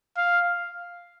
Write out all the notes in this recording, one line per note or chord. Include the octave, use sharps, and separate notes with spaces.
F5